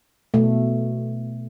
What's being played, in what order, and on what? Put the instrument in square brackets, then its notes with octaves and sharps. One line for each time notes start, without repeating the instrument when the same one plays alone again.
[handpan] B2 A3